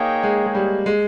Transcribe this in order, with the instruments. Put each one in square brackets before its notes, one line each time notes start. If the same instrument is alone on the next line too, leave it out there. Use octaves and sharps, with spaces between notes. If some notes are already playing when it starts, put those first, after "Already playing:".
Already playing: [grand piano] A#3 [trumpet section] D#4 G#4 C#5 G5
[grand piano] G#3
G#3
G3
G#3